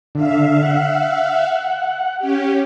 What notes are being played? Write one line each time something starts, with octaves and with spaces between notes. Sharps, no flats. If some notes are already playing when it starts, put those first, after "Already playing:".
D3 E5 F5
F#5
C#4 G4